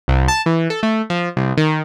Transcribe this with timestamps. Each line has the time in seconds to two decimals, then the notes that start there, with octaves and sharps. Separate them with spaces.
0.08 C2
0.28 A5
0.46 E3
0.70 A4
0.83 A3
1.10 F3
1.37 C2
1.57 D#3